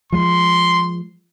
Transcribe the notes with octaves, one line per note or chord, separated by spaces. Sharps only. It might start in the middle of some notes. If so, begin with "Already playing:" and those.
F3 G#3 C6